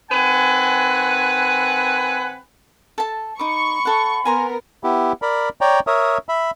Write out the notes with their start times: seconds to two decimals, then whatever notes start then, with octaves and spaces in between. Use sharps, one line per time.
0.11 D#3 C4 B4 F#5 G#5
2.98 A4 A5
3.39 D#4 B5 C#6 D6
3.85 A4 F#5
4.25 B3 A#4 G#5 A#5 C6
4.84 B3 E4 G4
5.22 A#4 D5 B5
5.61 C#5 D5 G5 A#5
5.87 A#4 C#5 E5 D#6
6.29 E5 B5